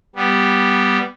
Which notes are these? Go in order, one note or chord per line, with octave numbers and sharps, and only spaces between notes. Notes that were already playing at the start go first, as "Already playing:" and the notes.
G3 B3